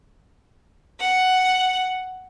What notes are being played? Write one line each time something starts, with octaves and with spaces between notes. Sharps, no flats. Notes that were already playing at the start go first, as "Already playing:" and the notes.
F#5